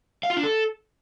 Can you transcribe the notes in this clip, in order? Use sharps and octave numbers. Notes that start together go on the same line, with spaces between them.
F5
F4
D4
A4